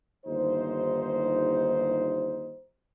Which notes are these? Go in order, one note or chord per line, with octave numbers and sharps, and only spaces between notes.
G1 D#2 D#4 C5